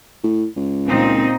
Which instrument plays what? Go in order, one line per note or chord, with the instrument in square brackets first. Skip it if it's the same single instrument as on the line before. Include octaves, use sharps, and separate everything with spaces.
[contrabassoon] A2
C#2
[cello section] A#2 C4 D#4